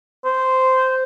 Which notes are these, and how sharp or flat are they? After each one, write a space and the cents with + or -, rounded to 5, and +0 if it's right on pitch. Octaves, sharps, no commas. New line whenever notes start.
C5 -10